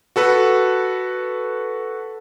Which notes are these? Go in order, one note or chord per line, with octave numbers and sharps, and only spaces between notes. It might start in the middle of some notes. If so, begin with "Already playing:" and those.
F#4 A4 B4